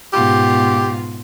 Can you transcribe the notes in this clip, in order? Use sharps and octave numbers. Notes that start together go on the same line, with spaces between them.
G#2 B2 F4 G4